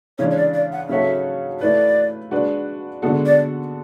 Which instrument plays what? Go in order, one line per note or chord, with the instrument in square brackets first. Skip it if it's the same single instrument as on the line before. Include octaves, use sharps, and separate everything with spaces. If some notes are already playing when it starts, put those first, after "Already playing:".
[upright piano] C#3 E3 G#3 D4 [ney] C#5
[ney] C#5
D5
D5
F#5
[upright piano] C#3 F#3 C#4 F#4 A4 [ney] E5
[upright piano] A3 E4 B4 [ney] D5
[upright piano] G#3 D4 F#4 B4
D3 G#3 B3 F#4 A4
[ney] D5